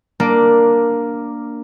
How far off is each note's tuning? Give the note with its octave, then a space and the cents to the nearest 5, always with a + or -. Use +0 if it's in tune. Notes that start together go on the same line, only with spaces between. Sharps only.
A#3 +0 D4 +0